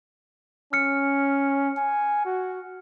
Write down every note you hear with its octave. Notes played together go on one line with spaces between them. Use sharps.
C#4 F6 C#7
G#5
F#4